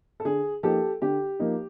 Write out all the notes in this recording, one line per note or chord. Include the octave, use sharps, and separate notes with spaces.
A4
D3 G#4
F3 A#3 D#4 G4 A4
D3 G4
F3 A#3 D#4